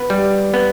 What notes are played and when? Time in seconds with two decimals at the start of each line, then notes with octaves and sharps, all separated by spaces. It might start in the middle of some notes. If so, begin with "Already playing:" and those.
Already playing: B3 B4
0.10 G3
0.54 B3